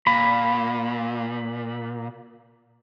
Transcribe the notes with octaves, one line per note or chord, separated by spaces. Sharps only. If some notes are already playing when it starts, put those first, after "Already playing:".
A#2 B5